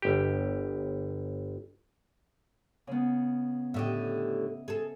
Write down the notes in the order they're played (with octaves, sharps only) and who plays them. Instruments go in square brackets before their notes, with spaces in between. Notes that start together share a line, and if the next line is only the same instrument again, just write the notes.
[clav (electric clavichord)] G1 G4
[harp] C#3 B3
[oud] A2 D3 G4 [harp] D#5 E5
[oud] G#4 A4